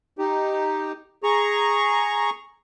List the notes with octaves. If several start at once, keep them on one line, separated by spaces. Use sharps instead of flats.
D#4 G4
G#4 A#5 C#6